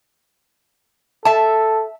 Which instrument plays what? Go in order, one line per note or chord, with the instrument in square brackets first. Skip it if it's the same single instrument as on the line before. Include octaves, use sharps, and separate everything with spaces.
[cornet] A4 [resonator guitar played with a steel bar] E5 A5